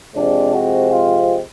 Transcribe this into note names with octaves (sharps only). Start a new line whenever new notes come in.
C3 F3 G#3 C4 D4
F#4
F4